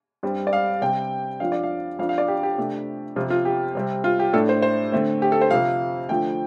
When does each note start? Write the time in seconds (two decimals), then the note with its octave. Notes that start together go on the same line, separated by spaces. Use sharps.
0.23 G2 G3 C4
0.47 D5
0.53 F5
0.81 C3 G3 C4 G5
1.40 F2 F3 D4 F5
1.52 D5
1.63 F5
1.99 F2 F3 D4 F5
2.09 F5
2.18 D5
2.28 G4
2.43 G4
2.58 C3 A3 D4
3.16 F2 C3 F3 F4
3.30 F4
3.45 G4
3.75 C3 G3 C4
4.04 F4
4.20 G4
4.33 A2 A3 D4 A4
4.49 C5
4.62 C5
4.92 D3 A3 C4
5.22 G4
5.32 A4
5.41 C5
5.51 F2 C3 F3 F5
6.09 D3 F3 A3 G5